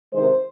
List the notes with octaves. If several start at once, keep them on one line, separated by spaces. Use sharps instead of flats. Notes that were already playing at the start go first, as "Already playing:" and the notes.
C3 D#3 G#3 C5